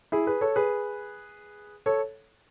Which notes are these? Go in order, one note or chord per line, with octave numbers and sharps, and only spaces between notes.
E4 G#4
G#4 B4
A4 C#5
G#4 B4
A4 C#5